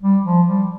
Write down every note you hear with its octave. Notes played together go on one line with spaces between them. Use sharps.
G3
F3
G3